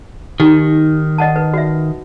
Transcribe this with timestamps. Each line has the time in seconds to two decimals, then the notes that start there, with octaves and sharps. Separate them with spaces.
0.40 D#3 D#4 G4
1.18 D#5 F#5 A5
1.36 B4
1.54 F#4 E5